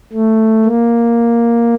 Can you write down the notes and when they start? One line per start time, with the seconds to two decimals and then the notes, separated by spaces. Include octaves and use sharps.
0.13 A3
0.65 A#3